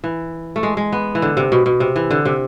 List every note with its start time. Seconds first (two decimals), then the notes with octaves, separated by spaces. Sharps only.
0.04 E3
0.56 A3
0.63 G#3
0.77 G#3
0.93 B3
1.15 E3
1.22 D3
1.37 C3
1.52 B2
1.66 B2
1.80 C3
1.96 E3
2.11 D3
2.25 C3